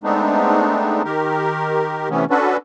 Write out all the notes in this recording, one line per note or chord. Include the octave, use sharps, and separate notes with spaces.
G#3 A3 B3 C4 D4 D#4
D#3 G4 A#4
C3 E3 A3 B3 C#4
C#4 D4 F#4 A4 B4